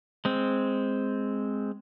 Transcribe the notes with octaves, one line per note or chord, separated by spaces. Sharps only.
G#3 C4